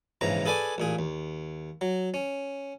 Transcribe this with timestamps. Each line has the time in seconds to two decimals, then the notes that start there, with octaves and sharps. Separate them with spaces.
0.21 A#1 G#2 C#3 E3 A#5
0.46 G#4 A4 B4 D5 G#5
0.78 A1 A#2 G#4
0.99 D#2
1.81 F#3
2.14 C#4